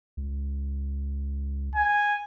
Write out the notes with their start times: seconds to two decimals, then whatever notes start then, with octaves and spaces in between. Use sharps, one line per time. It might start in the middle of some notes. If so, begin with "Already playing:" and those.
0.17 C#2
1.75 G#5